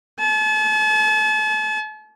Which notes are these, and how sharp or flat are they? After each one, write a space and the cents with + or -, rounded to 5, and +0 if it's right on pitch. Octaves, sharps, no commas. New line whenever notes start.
A5 -40